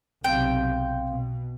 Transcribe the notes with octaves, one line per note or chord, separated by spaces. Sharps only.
B1 C3 C4 F5 G5
B2